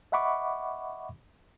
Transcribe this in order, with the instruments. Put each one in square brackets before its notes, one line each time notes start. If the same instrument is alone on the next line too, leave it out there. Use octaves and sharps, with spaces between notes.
[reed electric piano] D#5 E5 F#5 B5 C#6 D6